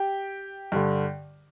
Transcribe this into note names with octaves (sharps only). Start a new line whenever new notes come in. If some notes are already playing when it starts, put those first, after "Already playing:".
Already playing: G4 G5
G2 D3